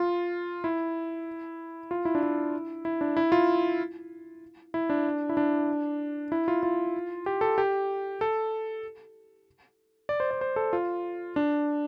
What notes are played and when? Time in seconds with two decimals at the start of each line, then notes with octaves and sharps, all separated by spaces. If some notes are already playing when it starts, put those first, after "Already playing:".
Already playing: F4
0.64 E4
1.91 F4
2.05 E4
2.15 D4
2.23 E4
2.85 E4
3.01 D4
3.17 E4
3.32 F4
4.74 E4
4.90 D4
5.29 E4
5.37 D4
6.32 E4
6.48 F4
6.63 F4
7.26 G4
7.41 A4
7.58 G4
8.21 A4
10.09 D5
10.20 C5
10.31 D5
10.41 C5
10.56 A4
10.73 F4
11.36 D4